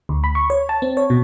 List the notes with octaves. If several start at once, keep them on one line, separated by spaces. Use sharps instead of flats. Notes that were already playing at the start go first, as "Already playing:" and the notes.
D2
B5
C#6
C#5
A5
C4
C#5
B2